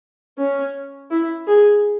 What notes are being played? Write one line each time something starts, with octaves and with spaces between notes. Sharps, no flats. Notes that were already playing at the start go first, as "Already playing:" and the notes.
C#4
E4
G#4